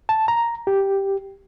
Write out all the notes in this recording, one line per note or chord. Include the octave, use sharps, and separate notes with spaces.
A5
A#5
G4